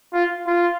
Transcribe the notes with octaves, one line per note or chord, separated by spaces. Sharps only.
F4
F4